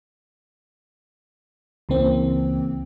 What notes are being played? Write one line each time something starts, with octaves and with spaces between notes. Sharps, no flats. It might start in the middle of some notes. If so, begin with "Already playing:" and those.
C#2 C#3 E3 A#3 C4